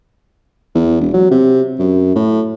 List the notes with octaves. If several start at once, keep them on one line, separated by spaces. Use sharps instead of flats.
E2
E1
F#3
C3
F#2
A2